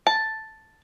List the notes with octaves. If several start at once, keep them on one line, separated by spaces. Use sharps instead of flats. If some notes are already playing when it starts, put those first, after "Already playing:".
A5